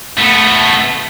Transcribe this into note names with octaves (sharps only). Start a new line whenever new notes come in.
A3 B3